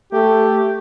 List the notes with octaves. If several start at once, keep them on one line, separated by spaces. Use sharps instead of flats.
A3 G4